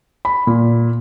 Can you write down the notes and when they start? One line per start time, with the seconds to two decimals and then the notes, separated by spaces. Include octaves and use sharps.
0.25 B5
0.47 A#2